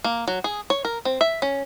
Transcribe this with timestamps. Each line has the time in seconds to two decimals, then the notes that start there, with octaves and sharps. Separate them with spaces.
0.04 A#3
0.28 F#3
0.44 G#4
0.70 C#5
0.85 A#4
1.05 C4
1.21 E5
1.42 C#4